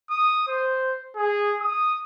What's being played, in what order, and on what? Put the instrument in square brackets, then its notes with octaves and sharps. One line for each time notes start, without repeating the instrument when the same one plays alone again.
[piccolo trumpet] D#6
C5
G#4
D#6